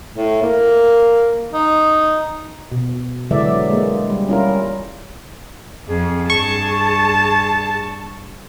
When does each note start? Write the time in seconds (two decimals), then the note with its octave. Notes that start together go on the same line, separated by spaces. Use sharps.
0.16 A2
0.42 A#3
1.52 D#4
2.72 B2
3.31 D3 E3 F#3 G#3 D5 E5
3.70 G#3 A#3
4.10 G3
4.28 C#4 E4 F4 A#4
5.88 F2 G#4
6.30 G2 A5 C#6